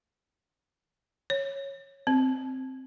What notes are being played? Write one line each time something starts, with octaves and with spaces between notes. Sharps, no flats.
C#5
C4